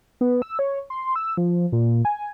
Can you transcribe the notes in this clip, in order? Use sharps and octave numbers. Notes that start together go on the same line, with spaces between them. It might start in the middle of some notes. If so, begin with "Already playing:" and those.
B3
E6
C#5
C6
E6
F3
A#2
G#5